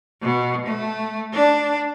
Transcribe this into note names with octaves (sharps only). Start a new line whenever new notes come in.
B2
A3
D4